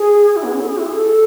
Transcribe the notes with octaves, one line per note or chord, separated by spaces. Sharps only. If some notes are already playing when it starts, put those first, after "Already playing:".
Already playing: G#4
E4
B3
C#4
A4
G#4
E4
G#4
A4